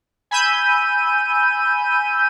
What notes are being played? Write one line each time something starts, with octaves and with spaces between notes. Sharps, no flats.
G#5 B5 E6 G6 D#7